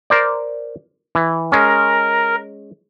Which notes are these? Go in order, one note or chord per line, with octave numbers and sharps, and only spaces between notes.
A#4 C5 D5
E3
G#3 C#4 A#4